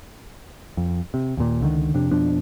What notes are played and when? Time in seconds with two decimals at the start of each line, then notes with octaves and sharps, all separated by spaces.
0.77 F2
1.14 C3
1.37 D#2 A#2
1.61 C#2 D3 D#3
1.94 F2 C3 D4
2.11 F2 B2 F3 D4